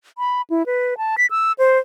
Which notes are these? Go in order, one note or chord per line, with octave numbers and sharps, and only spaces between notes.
B5
E4
B4
A5
B6
E6
C5